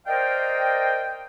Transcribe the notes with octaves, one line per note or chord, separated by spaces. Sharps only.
A#4 C5 D5 D#5 F5 G5